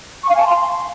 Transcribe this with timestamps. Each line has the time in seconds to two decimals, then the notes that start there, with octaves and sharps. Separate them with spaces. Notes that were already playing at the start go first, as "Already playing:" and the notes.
0.24 C#6
0.29 F5
0.35 G#5
0.40 A5
0.45 C6